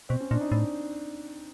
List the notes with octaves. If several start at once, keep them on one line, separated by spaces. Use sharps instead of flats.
B2 C4
C#4
A#2 D4
D#4
A2